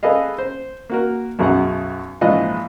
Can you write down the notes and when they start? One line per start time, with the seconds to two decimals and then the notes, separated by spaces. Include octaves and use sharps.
0.03 G#4 A4 B4 D#5 F5
0.38 C5
0.90 A#3 F#4 A#4
1.39 B1 F#2 G#4 F#5
2.21 A#1 G#2 E3 F4 B4 D#5